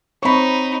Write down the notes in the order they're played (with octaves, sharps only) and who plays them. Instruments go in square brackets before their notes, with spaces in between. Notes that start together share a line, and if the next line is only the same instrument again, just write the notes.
[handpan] C4 C#5 [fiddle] D#4 [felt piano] B5 C#6